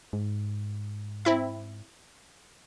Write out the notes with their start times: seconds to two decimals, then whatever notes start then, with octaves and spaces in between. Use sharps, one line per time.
0.13 G#2
1.25 C4 E4 E5